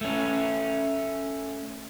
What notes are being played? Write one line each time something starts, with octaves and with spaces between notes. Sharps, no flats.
A3 C#4